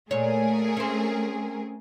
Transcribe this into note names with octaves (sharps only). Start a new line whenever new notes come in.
A#2 A3 G#4 A#4 C#5
C4 C#4